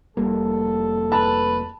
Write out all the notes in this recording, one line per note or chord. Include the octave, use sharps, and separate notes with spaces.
F1 G3 A#3 A4
B4 A5